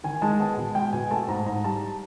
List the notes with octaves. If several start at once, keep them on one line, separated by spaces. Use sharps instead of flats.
D#3 G#5
G#3 A5
B3 A5
B2
G#3 G5
B2 G#5
A3 A5
G#2 A#5
G#2 A#5
G3 A5